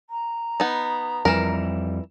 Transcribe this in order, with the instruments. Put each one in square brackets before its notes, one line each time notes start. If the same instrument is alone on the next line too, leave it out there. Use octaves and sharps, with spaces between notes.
[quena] A#5
[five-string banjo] B3 D#4
[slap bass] F2 G3 [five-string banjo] E3 A#4